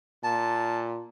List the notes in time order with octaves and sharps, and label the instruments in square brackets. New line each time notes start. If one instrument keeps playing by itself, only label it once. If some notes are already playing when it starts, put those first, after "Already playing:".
[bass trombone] A#2 [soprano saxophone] A5